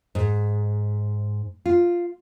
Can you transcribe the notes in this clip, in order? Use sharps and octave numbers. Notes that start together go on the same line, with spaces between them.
G#2
F4